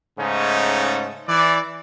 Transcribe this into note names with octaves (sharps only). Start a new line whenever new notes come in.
G#2 C#3 A3 C#4 D#4
E3 D5